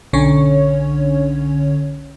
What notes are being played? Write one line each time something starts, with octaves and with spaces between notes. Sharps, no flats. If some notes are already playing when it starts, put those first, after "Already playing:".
B1 D3 C#4 C#5